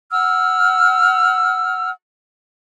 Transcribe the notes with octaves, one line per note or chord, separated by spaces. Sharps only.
F#5 E6 F6